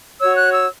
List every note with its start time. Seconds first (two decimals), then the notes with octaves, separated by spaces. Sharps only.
0.20 F#4 C#5 E6
0.36 F#6
0.52 E6